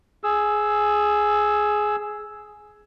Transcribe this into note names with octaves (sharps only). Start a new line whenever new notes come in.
G#4 E6